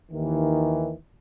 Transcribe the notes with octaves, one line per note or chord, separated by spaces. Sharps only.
D#2 D#3 E3